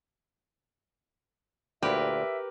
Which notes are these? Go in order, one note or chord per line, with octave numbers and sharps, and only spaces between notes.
D2 A#2 G4 A#4 B4 E5